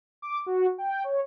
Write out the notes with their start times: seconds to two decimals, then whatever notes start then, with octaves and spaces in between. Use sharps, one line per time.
0.22 D6
0.46 F#4
0.78 G5
1.04 C#5